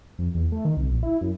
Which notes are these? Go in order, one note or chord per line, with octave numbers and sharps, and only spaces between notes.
F2
E2
A3
D#3
C2
A#1
E4
F#2